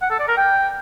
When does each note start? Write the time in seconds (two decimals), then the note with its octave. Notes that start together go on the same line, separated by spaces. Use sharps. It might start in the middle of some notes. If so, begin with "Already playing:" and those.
0.02 F#5
0.10 A4
0.19 D5
0.28 A#4
0.37 G5